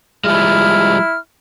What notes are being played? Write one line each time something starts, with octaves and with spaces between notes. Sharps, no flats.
F3 G3 G#3 E4 F6